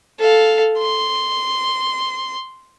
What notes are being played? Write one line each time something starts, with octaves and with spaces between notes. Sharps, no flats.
A4 F5
C6